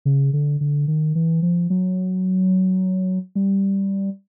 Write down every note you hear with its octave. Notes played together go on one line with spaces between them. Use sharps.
C#3
D3
D3
D#3
E3
F3
F#3
G3